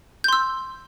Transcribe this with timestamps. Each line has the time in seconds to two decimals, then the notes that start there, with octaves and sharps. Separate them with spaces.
0.24 G6
0.28 C6
0.33 E6